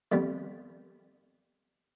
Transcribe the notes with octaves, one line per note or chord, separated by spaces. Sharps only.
F2 D#3 G3 B3